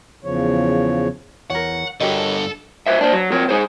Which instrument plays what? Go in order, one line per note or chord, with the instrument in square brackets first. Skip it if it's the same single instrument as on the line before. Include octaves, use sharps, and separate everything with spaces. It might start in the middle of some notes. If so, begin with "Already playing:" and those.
[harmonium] E2 C#3 F3 C#5
[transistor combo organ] E2 [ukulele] A#4 C#5 [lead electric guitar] F#5
[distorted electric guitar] G2 D3 [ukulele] F#4 G4 D#5 [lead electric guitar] A4 [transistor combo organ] A#4 C#5
[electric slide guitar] B4 C5 E5
D4 C5
F#3
C4 A#4 C#5
D#4 G#4 C5